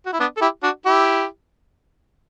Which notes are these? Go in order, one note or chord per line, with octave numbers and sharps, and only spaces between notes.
F#4
E4
B3 D4
A4
E4 G4
D4 F#4
E4 G4